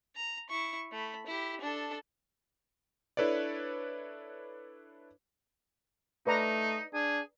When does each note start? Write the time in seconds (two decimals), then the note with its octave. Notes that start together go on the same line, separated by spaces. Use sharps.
0.16 A#5
0.50 E4 C#6
0.91 A3 B5
1.27 E4 G4
1.61 D4 A4
3.17 D4 E4 A4 B4 C#5 D5
6.27 A3 D#4 B4 D5 A#5
6.94 D4 G#4